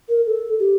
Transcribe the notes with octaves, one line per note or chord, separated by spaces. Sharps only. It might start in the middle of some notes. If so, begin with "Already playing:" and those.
A#4
A4
G4